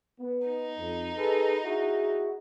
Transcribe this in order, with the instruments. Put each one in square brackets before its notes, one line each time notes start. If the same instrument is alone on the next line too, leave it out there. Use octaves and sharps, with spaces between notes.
[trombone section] B3
[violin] D#4
[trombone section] F2
G#4 A4 B4
E4 F#4 G#4